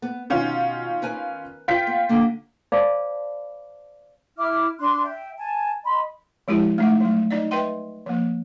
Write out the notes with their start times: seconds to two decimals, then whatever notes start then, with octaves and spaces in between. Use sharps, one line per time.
0.02 B3
0.30 B2 D#3 C#4 F4
1.02 A#4 B4 G#5
1.68 F4 G5 B6
1.87 B3
2.09 D3 A#3
2.72 C5 D5 F5 A5 B5 D6
4.38 E4 E5 D6 F6
4.79 D4 C6 F#6
5.04 E5 G5
5.37 G#5 A5
5.84 D#5 B5 C6
6.48 F3 G#3 E4 G4
6.78 A3 D#4 F#5
7.00 F#3 A3
7.31 D#4 D5 D#5
7.51 B4 D#5 E5 G5 C6
8.06 F3 A#3